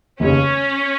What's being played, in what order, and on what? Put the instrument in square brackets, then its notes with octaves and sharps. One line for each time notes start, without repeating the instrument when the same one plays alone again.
[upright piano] F1 D#2 C#3 [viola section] C#4